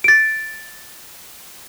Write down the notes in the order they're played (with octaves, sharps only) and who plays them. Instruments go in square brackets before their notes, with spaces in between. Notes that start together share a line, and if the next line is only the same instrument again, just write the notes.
[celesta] A6 D7